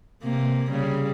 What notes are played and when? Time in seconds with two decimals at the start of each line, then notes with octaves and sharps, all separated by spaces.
0.23 C3 A#3
0.71 C#3 G3